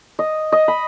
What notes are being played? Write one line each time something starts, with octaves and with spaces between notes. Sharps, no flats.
D#5
D#5
B5